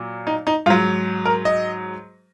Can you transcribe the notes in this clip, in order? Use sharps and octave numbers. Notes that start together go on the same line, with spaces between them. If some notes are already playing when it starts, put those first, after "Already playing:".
Already playing: A#2 F#3
D#4
D#4
G#2 F#3 F4
A#4
D#5